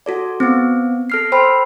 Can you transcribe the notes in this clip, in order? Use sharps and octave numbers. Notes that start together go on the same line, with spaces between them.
F#4 A4 D5
B3 C4
A4 F6 C7
C5 G5 B5 C6 E6